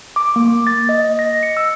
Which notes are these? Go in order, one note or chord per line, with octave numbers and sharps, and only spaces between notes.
D6
A#3
A6
D#5
A#6
C#7
E6